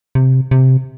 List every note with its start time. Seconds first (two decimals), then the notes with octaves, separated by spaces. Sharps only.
0.15 C3
0.51 C3